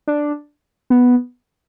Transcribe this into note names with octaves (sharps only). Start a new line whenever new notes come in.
D4
B3